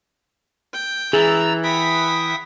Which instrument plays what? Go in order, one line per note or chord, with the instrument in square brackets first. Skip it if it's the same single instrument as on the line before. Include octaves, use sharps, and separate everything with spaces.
[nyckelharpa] G5
[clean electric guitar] E3 [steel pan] G#4 [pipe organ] A#5 E6 A6
[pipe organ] E5 G5 D#6 [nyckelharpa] F#5 B5